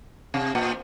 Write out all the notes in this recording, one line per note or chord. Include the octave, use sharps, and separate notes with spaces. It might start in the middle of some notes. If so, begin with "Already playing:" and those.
C3
A#2